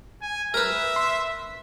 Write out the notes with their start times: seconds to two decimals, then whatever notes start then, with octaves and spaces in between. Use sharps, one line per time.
0.22 G#5
0.54 A#4 B4 E5
0.96 C6